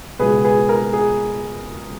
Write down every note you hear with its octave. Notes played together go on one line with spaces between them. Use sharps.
C#2 B2 G#4 B4
G#4 B4
A#4
G#4